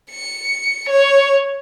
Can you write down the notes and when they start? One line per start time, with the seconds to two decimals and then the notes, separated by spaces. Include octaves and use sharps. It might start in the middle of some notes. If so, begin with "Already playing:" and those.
0.11 C#7
0.89 C#5